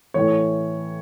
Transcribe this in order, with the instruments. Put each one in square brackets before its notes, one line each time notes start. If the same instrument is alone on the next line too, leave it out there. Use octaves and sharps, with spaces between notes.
[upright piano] A2 E3 C#5